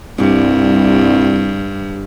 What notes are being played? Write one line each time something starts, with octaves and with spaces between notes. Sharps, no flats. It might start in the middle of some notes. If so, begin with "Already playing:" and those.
C2 G2